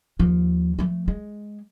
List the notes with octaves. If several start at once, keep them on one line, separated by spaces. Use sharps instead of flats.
D#2 F3
F3 A3
G#3